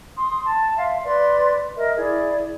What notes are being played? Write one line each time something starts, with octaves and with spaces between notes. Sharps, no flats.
C6 D#6
A5
E5 F5 C6
B4 D5 C6
A#4 D#5 E5
E4 G#4 D5